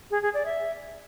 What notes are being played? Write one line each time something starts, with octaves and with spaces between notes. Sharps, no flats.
G#4
G#4
D5
E5